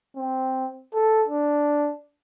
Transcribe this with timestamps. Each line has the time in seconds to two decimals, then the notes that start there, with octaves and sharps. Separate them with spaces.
0.16 C4
0.94 A4
1.28 D4